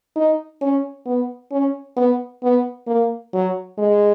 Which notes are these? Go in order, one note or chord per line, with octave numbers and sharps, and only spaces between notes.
D#4
C#4
B3
C#4
B3
B3
A#3
F#3
G#3